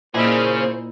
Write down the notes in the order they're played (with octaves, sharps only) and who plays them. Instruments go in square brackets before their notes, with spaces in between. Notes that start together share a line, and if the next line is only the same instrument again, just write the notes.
[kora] A#2 E4 D#5 [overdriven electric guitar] C#3 G#4 [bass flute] A#3 [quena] C5